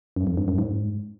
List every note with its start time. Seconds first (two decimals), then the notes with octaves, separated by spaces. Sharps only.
0.16 F#2
0.27 F2
0.37 G2
0.48 F#2
0.58 G#2